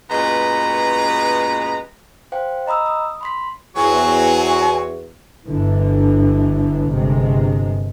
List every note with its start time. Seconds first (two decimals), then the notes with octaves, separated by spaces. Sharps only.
0.10 F#2 A#2 G#3 B3 B4 A#5
2.32 C5 F5 G5
2.66 D#5 A#5 B5 D#6 E6
2.86 D#6
3.21 B5 C6 B6
3.76 E2 F#3 C4 F#4 C#5 G#5
5.47 G1 D3 E3
6.90 G1 C3 G#3